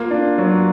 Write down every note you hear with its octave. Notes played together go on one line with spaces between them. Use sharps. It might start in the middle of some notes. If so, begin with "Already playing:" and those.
Already playing: A#3 F4
D4
F#3